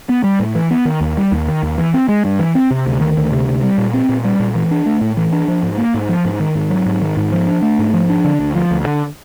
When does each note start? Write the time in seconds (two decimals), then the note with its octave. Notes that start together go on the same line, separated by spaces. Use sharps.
0.09 B3
0.24 G3
0.40 A2
0.55 E3
0.71 B3
0.85 D#3
1.01 D#2
1.17 G3
1.32 D#2
1.48 D#3
1.63 D#2
1.78 E3
1.94 C4
2.09 G#3
2.25 G2
2.39 E3
2.55 C4
2.71 C3
2.86 D2
3.01 D#3
3.17 D2
3.32 C3
3.48 D2
3.63 G3
3.78 A#2
3.94 C4
4.09 A#2
4.25 G3
4.40 A#2
4.55 E3
4.71 D4
4.86 A3
5.01 A2
5.17 E3
5.33 D4
5.48 F3
5.63 G#2
5.78 A#3
5.94 G#2
6.09 F3
6.25 G#2
6.40 D#3
6.55 G#2
6.70 F#3
6.86 G#2
7.01 D#3
7.17 G#2
7.32 F3
7.48 D4
7.62 A3
7.79 G#2
7.94 F3
8.10 D4
8.25 D3
8.40 D2
8.55 F3
8.71 D2
8.87 D3